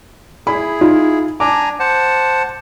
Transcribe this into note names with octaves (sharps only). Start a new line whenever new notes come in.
E4 G#4 B5
D#4 F4
D4 G#5 A#5 D6
C5 F#5 A5